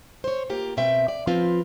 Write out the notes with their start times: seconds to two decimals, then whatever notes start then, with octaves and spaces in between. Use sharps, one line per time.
0.24 C5 C#5
0.50 A#3 F4 G4
0.77 B2 C4 E5 G5
1.08 D5
1.27 F3 C4 F4 B4